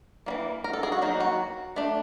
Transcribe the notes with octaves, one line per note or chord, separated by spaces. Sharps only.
E3 G3 A#3
A#4
A4
G#4
F#4
D#3 F#3 A#3 D#4
F#4
A3 D4